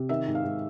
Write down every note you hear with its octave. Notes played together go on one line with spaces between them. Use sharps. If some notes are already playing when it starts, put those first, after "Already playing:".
Already playing: C3
D#3 E5
G#2
F5
G#2